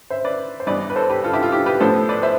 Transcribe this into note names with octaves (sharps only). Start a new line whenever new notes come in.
C5 E5
B4 D5
C5
G2 E3 B3 B4 D5
B4
A4 C5
G4 B4
F4 A4
E4 G4
F4
E4 G4
G4 B4
A2 F3 B3 A4 C5
B4 D5
C5 E5